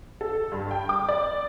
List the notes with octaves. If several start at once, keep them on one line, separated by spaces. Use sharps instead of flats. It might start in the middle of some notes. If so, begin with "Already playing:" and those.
A4
G2
G5
D6
D5